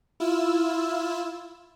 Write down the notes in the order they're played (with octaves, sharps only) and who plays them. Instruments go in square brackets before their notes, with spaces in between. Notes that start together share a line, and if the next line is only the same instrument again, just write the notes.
[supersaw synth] E4 F4 E6